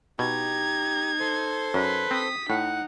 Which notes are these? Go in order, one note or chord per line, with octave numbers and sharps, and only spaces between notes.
B2 D#4 G4 A#5 G#6
A4 C5 C6
F#2 B4
C4 D#6 B6
A2 D#4 F#5